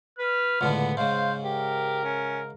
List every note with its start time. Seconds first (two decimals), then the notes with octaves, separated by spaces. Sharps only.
0.18 B4 F6
0.61 C#2 A2 D3 B3
0.97 G#2 C#3 C5 F5
1.44 G4 A#4
2.04 C#4